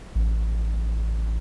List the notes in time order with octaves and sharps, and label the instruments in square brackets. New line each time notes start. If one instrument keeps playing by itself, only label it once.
[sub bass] A1